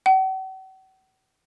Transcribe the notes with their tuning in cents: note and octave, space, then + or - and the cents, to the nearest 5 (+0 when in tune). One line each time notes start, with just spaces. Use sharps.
F#5 +45